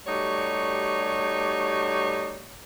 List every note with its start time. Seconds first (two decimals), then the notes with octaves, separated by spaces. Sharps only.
0.07 G3 A3 D#4 F#4 G4 C#5